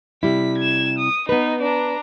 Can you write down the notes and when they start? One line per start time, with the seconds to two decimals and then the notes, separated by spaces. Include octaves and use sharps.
0.23 C3 G3 E4 B6
0.58 G#6 E7
0.98 D#6
1.29 B3 D#4 B4
1.62 D4 A#5